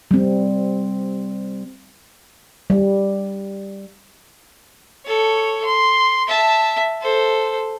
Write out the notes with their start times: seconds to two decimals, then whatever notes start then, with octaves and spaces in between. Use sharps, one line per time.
0.11 G3 C4
2.70 G3
5.05 A4 C#5
5.64 C6
6.28 E5 A5
7.01 A4 C5